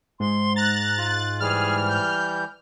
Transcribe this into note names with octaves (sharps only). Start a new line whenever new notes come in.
G#2 C6
A#5 F#6 A6
F4
E3 G3 G#4 F6
G6